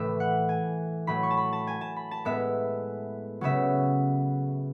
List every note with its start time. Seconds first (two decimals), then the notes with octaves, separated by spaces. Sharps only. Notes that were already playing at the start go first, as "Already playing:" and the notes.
Already playing: A2 E3 A3 E5
0.20 F#5
0.49 G#5
1.07 A2 F#3 A3 B5
1.23 C#6
1.30 A5
1.37 B5
1.53 A5
1.67 G#5
1.81 A5
1.96 B5
2.11 A5
2.25 A2 G#3 B3 E5
3.41 C#3 F#3 B3 E5